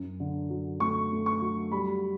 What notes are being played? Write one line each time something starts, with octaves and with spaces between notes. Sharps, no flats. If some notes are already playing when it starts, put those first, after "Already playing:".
Already playing: F#2
D3
F#3
A3 C#6
A3
C#6
F#3
G3 B5